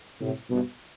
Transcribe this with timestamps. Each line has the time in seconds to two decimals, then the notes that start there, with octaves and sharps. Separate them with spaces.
0.20 A2 C3
0.50 G2 B2